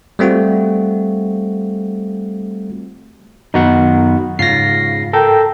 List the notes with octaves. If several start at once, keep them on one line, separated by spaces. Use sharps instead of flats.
G3 A3 C4 F4 F#4
F#2 D#3 B3 D#4 F#4 F#5
G#2 C#3 F4 A#6 C7
A4 A#4 G5